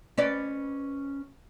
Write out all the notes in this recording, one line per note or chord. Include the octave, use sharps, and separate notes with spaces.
C#4 B4 D5